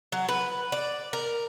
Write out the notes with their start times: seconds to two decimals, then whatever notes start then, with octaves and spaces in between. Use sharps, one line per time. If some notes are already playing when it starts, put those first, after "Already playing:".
0.12 F#3
0.28 B4
0.72 D5
1.13 A#4